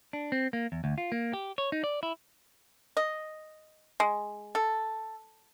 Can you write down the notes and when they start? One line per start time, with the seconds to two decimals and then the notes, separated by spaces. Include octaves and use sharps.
0.13 D4
0.32 C4
0.53 A#3
0.72 E2
0.84 D2
0.98 F4
1.12 A#3
1.33 G4
1.58 C#5
1.72 D#4
1.84 D5
2.03 E4
2.97 D#5
4.00 G#3
4.55 A4